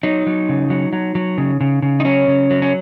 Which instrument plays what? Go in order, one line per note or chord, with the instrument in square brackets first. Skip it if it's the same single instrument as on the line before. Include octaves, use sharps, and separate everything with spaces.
[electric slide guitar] F#3 D#4
F#3
C#3
F#3
F#3
F#3
C#3
C#3
C#3
D#4
F#3 C#4
C#3
F#3
C#4